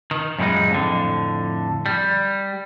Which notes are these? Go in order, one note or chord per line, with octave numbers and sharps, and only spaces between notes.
D#3
F#2 A#2 G3 G#3 D#4
F2 A2 D3
G3